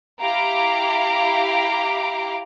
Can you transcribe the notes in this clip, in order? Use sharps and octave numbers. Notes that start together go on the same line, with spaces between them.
E4 G4 F5 A#5 D6